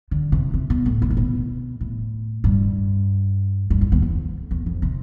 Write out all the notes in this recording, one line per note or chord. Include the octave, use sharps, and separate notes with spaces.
D3
C3
C3
B2
A2
C3
A2
B2
A2
G2
G2
F2
E2
F2
E2
F2
C3